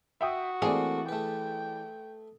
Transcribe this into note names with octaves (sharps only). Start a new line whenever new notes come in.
F#4 E5 G5 D#6
E3 A3 A#3 C4 G#4 D5
A3 B4 G5